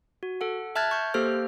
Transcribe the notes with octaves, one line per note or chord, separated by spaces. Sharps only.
F#4
A4 F#5
E5 A5 F6 F#6 G#6 A6
C#6 G6
A#3 G4 A4 C5 F6